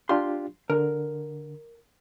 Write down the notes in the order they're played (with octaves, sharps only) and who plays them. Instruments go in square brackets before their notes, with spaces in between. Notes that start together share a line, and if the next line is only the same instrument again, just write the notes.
[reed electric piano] D4 F4 G4 [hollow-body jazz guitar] C6
[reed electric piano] D3 [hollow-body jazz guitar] A#4